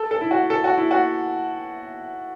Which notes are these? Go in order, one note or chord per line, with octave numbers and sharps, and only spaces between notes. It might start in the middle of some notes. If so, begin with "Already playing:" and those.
Already playing: A4
A4
E4
F#4
A4
F#4
E4
F#4